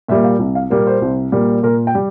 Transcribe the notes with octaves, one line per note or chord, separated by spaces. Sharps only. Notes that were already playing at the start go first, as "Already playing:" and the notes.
A#2 G3 A#3 E5
F5
C2
F5
A#2 G3 A#3 A#4
C5
C2
A#2 G3 A#3
A#2 A#4
G5
G3